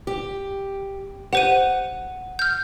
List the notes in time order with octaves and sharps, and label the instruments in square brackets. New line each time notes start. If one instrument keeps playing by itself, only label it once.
[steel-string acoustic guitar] G4
[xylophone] G4 C5 D#7 [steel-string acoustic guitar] F#5
[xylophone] F6 G6